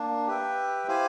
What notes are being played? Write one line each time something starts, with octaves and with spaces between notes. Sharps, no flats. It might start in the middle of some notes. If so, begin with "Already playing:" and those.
Already playing: A#3 D4
G4 B4 E5 G5
E4 G4 C5 F5 G#5